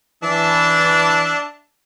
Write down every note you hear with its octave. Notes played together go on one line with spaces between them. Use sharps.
E3 D4 E5 A5